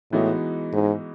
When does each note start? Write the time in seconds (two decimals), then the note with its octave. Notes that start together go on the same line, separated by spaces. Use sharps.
0.12 A2 E3 G#3 B3 D#4 F#4
0.73 G#2